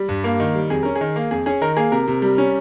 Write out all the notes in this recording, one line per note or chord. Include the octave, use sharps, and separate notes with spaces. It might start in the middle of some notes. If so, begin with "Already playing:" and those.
Already playing: G3
G2
A#3
D#3
G3
F2 G#4
C#4 A#4
G#4
D#3
A#3
F2 G#4
C#4 G#4
D#3 A#4
A#3 G#4
C3 A#4
C3
G3
C#4